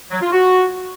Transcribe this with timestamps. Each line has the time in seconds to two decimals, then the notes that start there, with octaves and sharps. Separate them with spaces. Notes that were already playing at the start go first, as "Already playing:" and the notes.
0.11 F#3
0.21 F4
0.32 F#4